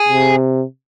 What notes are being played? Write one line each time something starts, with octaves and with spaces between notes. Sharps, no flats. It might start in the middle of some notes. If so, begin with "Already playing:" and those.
Already playing: G#4
C3